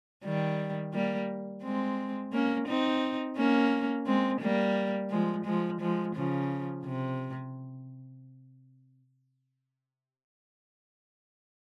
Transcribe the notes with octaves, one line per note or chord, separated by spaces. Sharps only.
D#3 G3
G3 A#3
G#3 C4
A#3 C#4
C4 D#4
A#3 C#4
G#3 C4
G3 A#3
F3 G#3
F3 G#3
F3 G#3
C#3 F3
C3